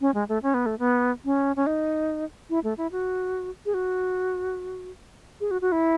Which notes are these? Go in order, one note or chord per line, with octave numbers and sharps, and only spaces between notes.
C#4
G#3
A3
C#4
B3
A3
B3
C#4
C#4
D#4
E4
A3
E4
F#4
G#4
F#4
G#4
F#4
F#4
E4